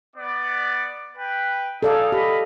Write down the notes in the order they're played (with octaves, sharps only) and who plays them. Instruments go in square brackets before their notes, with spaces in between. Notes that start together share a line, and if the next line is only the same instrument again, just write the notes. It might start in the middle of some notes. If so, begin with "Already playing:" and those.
[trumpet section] B3 D5
B4 G5
[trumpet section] D#4 G#4 [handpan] A4 D5 F5
[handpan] G4 [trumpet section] D#5 B5